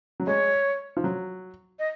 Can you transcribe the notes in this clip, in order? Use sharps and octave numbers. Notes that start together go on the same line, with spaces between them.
F#3
G#3 C#5
F3
F#3
D#5